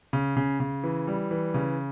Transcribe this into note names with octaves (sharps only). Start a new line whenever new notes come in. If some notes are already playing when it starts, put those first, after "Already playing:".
C#3
C#3
C#3
E3
G3
E3
C#3